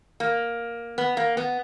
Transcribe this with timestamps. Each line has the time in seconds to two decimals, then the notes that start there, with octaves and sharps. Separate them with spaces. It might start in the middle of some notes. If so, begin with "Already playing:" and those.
0.20 A#3
0.98 B3
1.17 A#3
1.37 B3